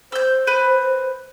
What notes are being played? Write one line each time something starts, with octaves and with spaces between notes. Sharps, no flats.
C5 E6 G6
B4